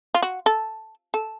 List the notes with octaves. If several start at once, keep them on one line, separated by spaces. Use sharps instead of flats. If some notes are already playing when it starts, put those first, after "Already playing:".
F4
F#4
A4
A4